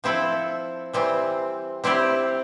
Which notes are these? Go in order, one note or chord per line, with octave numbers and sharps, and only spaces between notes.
F3 C4 E4 A4
E3 G3 C4
G3 C4 E4 G4